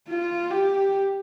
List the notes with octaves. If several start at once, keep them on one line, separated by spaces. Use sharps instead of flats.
F4
G4